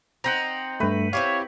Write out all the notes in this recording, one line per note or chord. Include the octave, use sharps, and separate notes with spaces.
C4 D#4 F#5 G5 A#5
G2 A3 B4
C4 E4 G4 C#5 F5